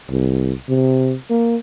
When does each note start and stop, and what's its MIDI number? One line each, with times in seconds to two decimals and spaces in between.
0.10 0.52 36
0.69 1.15 48
1.30 1.56 58